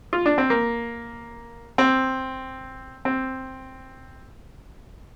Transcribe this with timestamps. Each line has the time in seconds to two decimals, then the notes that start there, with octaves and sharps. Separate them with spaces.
0.13 F4
0.26 D4
0.38 C4
0.50 A#3
1.78 C4
3.05 C4